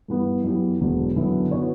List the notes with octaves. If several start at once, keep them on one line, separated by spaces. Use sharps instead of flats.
G2 E3 B3
F#2 E3 B3 E4 G4
E1 E2 D3 F#3
F#2 D3 F#3 B3 E4
E3 B3 F#4 C#5